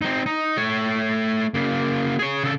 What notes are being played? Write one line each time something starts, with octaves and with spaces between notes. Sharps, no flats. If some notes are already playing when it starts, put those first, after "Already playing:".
C4 D#4
D#4
A3 C#5
C#3 A#3
G#4 C#5
C#3 A4